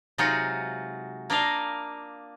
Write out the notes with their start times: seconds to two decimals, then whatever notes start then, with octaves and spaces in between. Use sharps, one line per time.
0.18 C3 F#3 G#3 D#4 F4 F#4
1.30 A#3 D4 A#4 D#5 F5